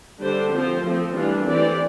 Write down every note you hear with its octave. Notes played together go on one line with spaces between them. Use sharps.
D3 G3 D4 G4 C5
F3 C4 F4 C5
F3 A3 C4
E3 G3 D4 F4
E3 A3 C4 G4 D5